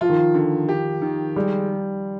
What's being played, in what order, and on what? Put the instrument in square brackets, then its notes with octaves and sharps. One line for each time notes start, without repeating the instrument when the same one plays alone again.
[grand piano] F3 [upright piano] F4
[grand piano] D#3
F3
[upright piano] D3
G4
D#3
[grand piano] G3 [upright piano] G#3